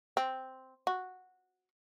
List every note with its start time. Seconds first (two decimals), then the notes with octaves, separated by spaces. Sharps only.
0.17 C4
0.87 F#4